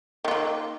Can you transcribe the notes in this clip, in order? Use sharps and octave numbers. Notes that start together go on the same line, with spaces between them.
D#3 A#3 F4